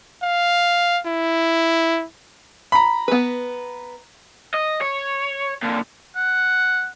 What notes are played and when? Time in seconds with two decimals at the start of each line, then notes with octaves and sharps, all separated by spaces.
0.23 F5
1.06 E4
2.72 A#5 B5
3.08 B3 B4
4.54 D#5
4.81 C#5
5.63 A#2 D3
6.16 F#5